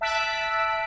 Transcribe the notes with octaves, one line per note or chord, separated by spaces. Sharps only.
E5 A5 E6 F#6 B6 D7